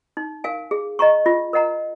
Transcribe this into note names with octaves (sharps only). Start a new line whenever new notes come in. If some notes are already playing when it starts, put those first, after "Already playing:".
D#4
A#4 F5 G#5
G#4
D#5 A#5 C#6
F4
A#4 D#5 F#5 A#5